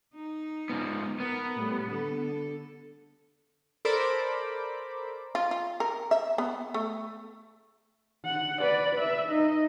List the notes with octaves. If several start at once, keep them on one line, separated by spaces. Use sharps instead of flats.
D#4
G#2 B3
B3 A#4
A2 G3
D3 A4
A4 A#4 C5 D5 B5 D6
F4
F4
A#4
E5
B3
A3
F#5
B4 D5
B4 E5
D#4 D#5